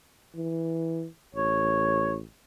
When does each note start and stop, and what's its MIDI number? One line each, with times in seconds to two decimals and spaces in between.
0.36 1.07 52
1.35 2.24 33
1.35 2.14 73